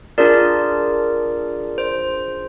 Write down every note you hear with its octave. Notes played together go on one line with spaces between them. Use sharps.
D4 F4 G#4 A#4 D5
C5